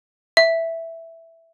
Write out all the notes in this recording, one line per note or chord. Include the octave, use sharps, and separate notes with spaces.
E5